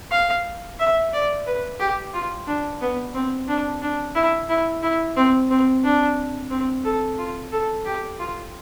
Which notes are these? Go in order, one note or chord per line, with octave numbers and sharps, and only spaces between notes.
F5
E5
D5
B4
G4
F4
D4
B3
C4
D4
D4
E4
E4
E4
C4
C4
D4
C4
A4
F4
A4
G4
F4